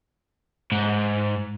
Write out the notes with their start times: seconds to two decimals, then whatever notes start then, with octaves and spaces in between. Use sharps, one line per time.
0.72 G#2